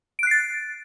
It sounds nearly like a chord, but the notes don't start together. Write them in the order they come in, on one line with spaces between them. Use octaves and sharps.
D7 F#6 C7 A6